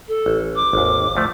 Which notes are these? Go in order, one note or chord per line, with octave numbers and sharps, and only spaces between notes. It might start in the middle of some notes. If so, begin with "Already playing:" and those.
A4
A1
D6
G#1 D#2
D2 F3 A3